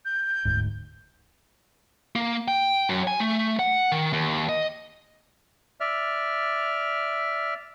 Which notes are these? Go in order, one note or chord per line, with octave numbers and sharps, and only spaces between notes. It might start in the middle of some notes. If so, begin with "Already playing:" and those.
G6
E1 D2 G#2
A#3
G5
F#2
G#5
A3
F#5
D#3
D#2
D#5
D5 E5 F6